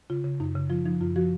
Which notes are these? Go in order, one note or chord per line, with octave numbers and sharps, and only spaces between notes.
C#3 F4
C#3
F#2 D#4
C#3
F3 F4
F3 D#4
F#2 F4
F3 F#4